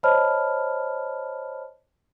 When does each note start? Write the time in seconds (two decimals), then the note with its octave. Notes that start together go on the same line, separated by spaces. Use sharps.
0.03 C5 C#5 D#5 A5 B5 F6